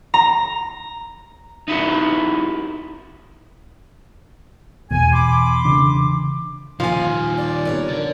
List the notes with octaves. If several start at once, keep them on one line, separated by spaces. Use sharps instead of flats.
A#5
D#4 E4 F#4 A#4
E2 B2 G#5
B5 C6 D6
C#3 E3 D4
A#2 D#3 F3 F5 G#5
D5
B3 A#4 C#5
D3